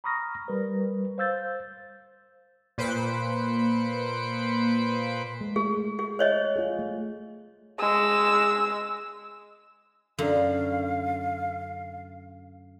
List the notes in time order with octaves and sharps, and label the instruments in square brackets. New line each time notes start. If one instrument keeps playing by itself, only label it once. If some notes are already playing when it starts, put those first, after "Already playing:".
[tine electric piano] A#5 B5 C#6 D#6 F6 A#6
G3 A#4 B4
C5 F5 E6 G6 A6
[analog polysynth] A#2 B4 C5 B6 C#7 D7
[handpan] G#3
[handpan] A3 [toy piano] G#4
[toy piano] G#4
C5 C#5 D#5
[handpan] F4 G#4
A3
[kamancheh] G#3 E6
[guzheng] F#2 D3 [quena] F5